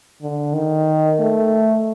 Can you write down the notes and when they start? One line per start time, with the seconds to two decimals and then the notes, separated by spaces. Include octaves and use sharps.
0.21 D3
0.54 D#3
1.19 A3